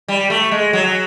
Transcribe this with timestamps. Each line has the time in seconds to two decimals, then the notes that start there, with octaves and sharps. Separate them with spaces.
0.08 G3
0.30 A3
0.52 G#3
0.73 F#3